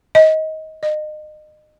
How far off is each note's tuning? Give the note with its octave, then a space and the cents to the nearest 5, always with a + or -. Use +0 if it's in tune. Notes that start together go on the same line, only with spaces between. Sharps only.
D#5 +20
D#5 -30